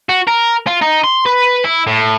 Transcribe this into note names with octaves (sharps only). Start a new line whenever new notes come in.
F#4
A#4
F4
D#4
C6
B4
E4
A2